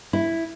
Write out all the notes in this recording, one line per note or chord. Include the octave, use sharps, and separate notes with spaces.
E4